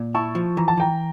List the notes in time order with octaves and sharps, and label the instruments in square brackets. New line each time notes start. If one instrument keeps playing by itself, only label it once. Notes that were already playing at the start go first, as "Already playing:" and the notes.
Already playing: [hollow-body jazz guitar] A#2
[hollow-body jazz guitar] E4 [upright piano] A5 C#6
[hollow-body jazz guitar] F3
[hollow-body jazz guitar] E3 [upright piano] A#5
[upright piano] A5
[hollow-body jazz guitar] E3 [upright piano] G5 A#5